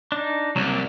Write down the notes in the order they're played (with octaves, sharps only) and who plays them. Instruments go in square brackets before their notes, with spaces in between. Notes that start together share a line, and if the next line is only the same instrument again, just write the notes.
[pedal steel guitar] D4 D#4
[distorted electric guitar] C2 [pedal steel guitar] F#3 A#3